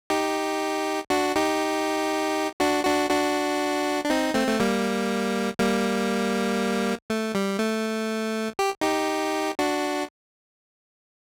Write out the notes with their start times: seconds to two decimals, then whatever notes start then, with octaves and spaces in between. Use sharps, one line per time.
0.10 D#4 G4
1.10 D4 F#4
1.36 D#4 G4
2.60 D4 F#4
2.84 D4 F#4
3.10 D4 F#4
4.05 D4
4.10 C4 D#4
4.34 A3 C4
4.47 A3
4.60 G3 A#3
5.59 G3 A#3
7.10 A3
7.35 G3
7.59 A3
8.59 G4
8.81 D#4 G4
9.59 D4 F#4